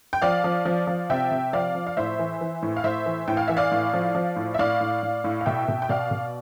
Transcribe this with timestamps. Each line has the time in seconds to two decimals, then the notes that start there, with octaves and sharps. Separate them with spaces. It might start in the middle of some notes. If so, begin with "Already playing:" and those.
0.13 G5
0.22 F3 D5 F5
0.44 F3
0.65 F3
0.87 F3
1.10 C3 E5 G5
1.31 C3
1.53 F3 D5 F5
1.75 F3
1.87 F5
1.97 A2 C5 E5
2.19 E3
2.41 E3
2.62 A2
2.76 F5
2.84 A2 C5 E5
3.06 E3
3.28 A2 G5
3.37 F5
3.48 E3 E5
3.57 D5 F5
3.72 A2
3.93 F3
4.15 F3
4.36 A2
4.54 E5
4.59 A2 D5 F5
4.81 A2
5.03 A2
5.24 A2
5.41 F5
5.46 B2 E5 G5
5.68 B2
5.82 G5
5.89 B2 D5 F5
6.11 B2